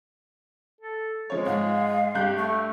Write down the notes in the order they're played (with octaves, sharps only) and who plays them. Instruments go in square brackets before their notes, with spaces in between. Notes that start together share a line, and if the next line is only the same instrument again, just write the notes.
[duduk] A4
[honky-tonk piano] F3 C#5 [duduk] G#3
[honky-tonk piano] G#2 [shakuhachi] F5
[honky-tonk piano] G2 F#6 G6 [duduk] G4
[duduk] A3 [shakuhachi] C#6